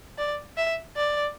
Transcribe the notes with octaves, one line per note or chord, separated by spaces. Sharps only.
D5
E5
D5